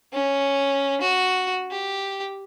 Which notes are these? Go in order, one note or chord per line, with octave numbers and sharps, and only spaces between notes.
C#4
F#4
G4